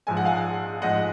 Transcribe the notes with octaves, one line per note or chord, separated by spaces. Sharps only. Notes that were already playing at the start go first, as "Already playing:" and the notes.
A#1 G#2 F3 G#5
F#5
F5 G#5
A#1 G#2 F3 D#5 F#5